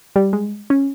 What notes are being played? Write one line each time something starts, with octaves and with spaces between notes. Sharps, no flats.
G3
G#3
C#4